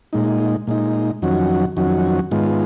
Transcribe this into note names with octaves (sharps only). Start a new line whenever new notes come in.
A#2 G#3 D#4
A#2 G#3 D#4
F2 D#3 F#3 C#4 F#4
F2 D#3 F#3 C#4 F#4
G#2 D#3 G#3 B3 F4